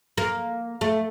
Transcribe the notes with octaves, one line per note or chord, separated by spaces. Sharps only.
A#3
A3